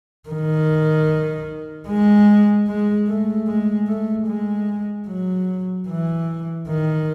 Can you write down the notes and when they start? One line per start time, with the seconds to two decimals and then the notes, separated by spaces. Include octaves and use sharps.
0.29 D#3
1.88 G#3
2.68 G#3
3.08 A3
3.48 G#3
3.88 A3
4.27 G#3
5.08 F#3
5.88 E3
6.68 D#3